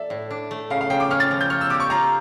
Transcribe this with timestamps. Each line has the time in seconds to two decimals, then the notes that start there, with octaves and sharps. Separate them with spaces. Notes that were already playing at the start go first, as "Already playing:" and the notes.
Already playing: A4 D5 E5
0.10 A2
0.31 D4
0.51 A3
0.70 C#3 F5
0.81 F5
0.90 C#3 G5
1.00 D6
1.11 C#4 F6
1.20 A6
1.31 F3
1.41 G6
1.50 C#5 F6
1.61 E6
1.70 G4 D6
1.80 C#6
1.90 F4 A#5